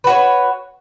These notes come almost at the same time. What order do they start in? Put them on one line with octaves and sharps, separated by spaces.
B4 F#4 C#5